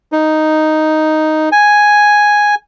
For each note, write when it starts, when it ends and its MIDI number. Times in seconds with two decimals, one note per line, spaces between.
0.12 1.49 63
1.52 2.55 80